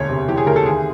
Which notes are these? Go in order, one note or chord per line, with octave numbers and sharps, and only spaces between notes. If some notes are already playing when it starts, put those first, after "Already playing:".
Already playing: E1 D2 C#5
C3
E3 G4
G#4
D2 A#4
A4
D#2 G#4